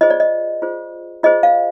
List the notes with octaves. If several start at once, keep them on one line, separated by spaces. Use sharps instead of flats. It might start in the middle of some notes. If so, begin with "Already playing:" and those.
F4 G#4 C5 D#5
D5
D#5
F4 G#4 C5
F4 G#4 C5 D#5
F5